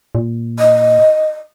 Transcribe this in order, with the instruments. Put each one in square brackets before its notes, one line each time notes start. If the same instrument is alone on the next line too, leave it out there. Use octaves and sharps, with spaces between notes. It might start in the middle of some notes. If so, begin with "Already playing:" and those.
[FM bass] A#2
[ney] D#5